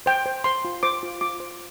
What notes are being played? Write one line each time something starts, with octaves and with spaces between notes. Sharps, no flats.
C5 G5
C5
C5 C6
F4
C5 D6
F4
F4 D6
C5